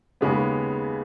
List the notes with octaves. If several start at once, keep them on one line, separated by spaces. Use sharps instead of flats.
D#2 C#3 G#3 B3